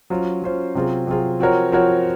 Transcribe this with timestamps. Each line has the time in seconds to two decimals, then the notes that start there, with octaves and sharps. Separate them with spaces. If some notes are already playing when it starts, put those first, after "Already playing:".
0.10 F#3 C#4 F4 C5
0.42 F#3 C#4 F4 C5
0.75 C3 F#3 C4 F4 G#4
1.07 C3 F#3 C4 F4 G#4
1.40 F3 C4 F#4 A#4 C#5
1.72 F3 C4 F#4 A#4 C#5